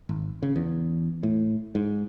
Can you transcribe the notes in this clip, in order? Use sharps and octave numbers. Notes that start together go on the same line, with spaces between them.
G#1
C#3
E2
A2
G#2